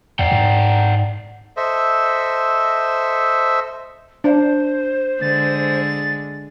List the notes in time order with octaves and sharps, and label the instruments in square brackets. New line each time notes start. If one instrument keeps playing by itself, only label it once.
[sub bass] E2 [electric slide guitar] D5 F#5 G5
[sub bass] G#2
[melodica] A4 C5 D#5 E5
[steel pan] D4 [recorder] C5
[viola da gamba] D3 G#3 [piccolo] A6